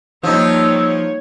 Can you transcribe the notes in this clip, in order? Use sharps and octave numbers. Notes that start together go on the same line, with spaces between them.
D#3 F3 G3 A#3 D#4 C#5 E6